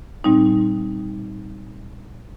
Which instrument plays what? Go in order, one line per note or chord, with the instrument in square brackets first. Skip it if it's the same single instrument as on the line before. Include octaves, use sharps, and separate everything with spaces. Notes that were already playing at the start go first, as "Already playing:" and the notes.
[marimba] A#2 G3 C4 D#4